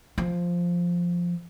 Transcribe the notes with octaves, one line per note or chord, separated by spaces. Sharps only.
F3